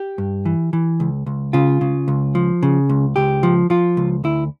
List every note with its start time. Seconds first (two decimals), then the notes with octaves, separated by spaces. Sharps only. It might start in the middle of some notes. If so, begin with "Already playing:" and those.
Already playing: G4
0.18 G2
0.45 E3
0.73 E3
1.00 C#2
1.26 C#2
1.53 C#3 F4
1.81 C#3
2.08 C#2
2.35 F3
2.63 C#3
2.89 C#2
3.16 C#2 G4
3.43 F3
3.70 F3 F4
3.97 C#2
4.24 D2 E4